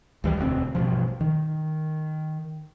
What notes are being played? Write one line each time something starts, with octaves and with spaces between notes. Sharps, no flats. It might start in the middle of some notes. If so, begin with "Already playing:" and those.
D2 E3 F3 G3
E1 D2 A3 C4
A1 G2 B2 F3
D#3